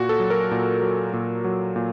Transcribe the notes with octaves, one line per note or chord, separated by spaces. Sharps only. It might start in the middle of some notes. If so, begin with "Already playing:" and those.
Already playing: A#2 F#4
A4
F#3
A#4
A#2
F#3
A#2
F#3
A#2